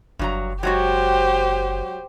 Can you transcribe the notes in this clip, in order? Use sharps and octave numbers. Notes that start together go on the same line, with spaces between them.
F#1 G2 F#3 A#5
F#3 G#3 F#4 G4 C5